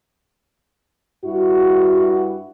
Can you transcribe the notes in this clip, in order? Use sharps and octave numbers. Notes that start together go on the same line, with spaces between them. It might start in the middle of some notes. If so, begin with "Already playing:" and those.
G2 E4 F#4